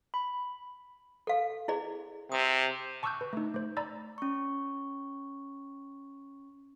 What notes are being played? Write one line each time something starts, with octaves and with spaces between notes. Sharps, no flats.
B5
A4 F5
E4 G#4 D5
C3 D#6
A5 C#6 D6 E6 F#6 G6
B4
A3 D#4
A3 C5
D5 A#5 B5 E6 A6
C#4 C#6